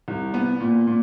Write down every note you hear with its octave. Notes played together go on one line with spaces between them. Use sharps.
C2
B3
A#2
A#2